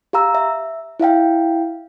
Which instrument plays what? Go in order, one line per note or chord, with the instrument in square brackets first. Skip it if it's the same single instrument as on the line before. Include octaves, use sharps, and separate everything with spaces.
[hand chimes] G4 F5 A#5 E6
E5
E4 E5 F5 G5